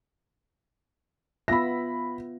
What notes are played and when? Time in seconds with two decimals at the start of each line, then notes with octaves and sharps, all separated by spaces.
1.48 B3 F4 E5 B5 A#6